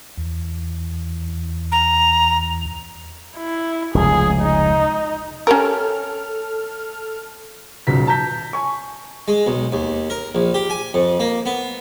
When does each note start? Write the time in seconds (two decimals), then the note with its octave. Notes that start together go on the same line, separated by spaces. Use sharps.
0.17 E2
1.72 A#5
3.36 E4
3.95 F1 C#2 G#4
4.41 D#4
5.47 C#4 G4 A4 A#4 F6
7.87 D#1 B1 C#3 B6
8.07 A5 A#5 G6 B6
8.53 G#5 C#6
9.28 G#3
9.47 B1
9.72 D#2
10.10 A#4
10.35 A#1
10.54 G4
10.70 G#5
10.94 F2
11.20 A#3
11.46 B3